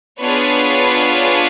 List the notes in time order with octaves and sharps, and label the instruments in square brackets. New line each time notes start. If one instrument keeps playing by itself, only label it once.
[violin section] B3 D4 F4 G#4 B4 C#5